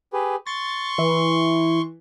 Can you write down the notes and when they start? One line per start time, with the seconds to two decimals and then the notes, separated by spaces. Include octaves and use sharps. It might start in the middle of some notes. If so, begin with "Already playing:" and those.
0.13 G4 G#4 B4
0.46 C6 C#6 A6
0.98 E3